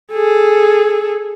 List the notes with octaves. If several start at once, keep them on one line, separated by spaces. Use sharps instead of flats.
G#4 A4